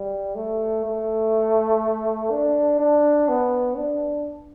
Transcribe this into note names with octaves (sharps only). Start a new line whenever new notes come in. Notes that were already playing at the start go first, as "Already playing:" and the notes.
Already playing: G3
A3
A3
D4
D4
B3
D4